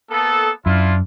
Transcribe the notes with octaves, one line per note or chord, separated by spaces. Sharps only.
A#3 B3 A4
F#2 D4 E4 F4